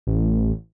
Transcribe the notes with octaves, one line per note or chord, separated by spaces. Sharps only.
A1